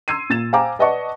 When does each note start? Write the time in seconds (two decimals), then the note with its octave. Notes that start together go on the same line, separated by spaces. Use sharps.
0.08 C6 E6 G#6 C7 D#7
0.30 A#2 A6 E7
0.53 C5 F5 G5 G#5 A#5 D6
0.79 B4 D5 D#5 F#5 A5 C#6